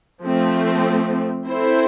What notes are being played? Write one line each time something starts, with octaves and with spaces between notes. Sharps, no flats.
F3 A3 C4
C4 E4 A4 C5